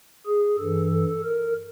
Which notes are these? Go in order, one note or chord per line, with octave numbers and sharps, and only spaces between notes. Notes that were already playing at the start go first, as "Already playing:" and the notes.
G#4
G2 E3 A4
A4
A#4